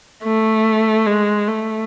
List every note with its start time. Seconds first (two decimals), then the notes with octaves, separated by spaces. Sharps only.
0.24 A3
1.06 G#3
1.48 A3